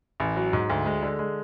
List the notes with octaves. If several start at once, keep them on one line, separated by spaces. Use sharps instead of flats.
A1
F#3
G#2
D2
G#3
D3
G#3